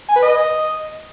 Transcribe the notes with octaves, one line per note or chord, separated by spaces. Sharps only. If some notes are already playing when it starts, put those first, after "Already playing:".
G#5
B4
D#5